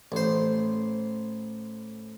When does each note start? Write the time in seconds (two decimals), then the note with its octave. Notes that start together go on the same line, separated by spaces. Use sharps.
0.12 A1 C5